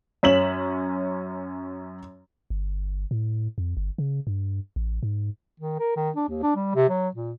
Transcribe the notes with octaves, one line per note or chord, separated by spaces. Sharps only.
F#2 C#4 B6 E7 F#7
G1
A2
F2
G1
C#3
G2
A1
G#2
D#3
A#4
D#3
D4
D#2
D4
G3
C3
F#3
A#2